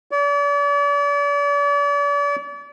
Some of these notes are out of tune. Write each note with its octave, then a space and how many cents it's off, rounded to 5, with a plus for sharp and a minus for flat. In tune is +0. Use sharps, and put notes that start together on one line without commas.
D5 -40